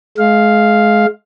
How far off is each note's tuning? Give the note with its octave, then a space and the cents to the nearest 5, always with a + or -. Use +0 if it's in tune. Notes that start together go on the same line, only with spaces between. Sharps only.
G#3 +30 F5 +0